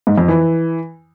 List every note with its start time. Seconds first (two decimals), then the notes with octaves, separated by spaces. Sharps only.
0.07 G#2
0.18 F2
0.28 E3